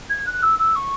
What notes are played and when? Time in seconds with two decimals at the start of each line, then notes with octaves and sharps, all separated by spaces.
0.09 G#6
0.26 F#6
0.42 E6
0.59 E6
0.75 C#6